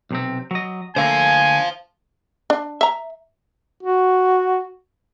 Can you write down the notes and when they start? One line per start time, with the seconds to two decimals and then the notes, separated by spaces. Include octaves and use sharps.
0.11 B1 C3 C4
0.51 F#3 D#5
0.96 D3 A3 A#3 C5 F5 G#5
2.50 D4
2.81 E5 A#5
3.83 F#4